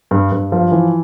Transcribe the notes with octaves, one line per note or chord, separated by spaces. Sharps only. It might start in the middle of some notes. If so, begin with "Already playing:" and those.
G2
G2
F3
E3